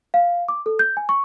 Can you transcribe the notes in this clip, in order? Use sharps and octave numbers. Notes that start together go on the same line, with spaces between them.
F5
D6
A4
G6
G#5
C#6